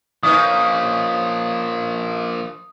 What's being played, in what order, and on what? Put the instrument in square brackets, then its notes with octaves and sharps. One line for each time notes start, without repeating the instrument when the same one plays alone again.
[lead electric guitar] F3 A#3 [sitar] C#4 D#4 B4 [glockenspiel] D#6